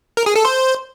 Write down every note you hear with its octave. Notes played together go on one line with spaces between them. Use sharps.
A#4
G#4
A4
C5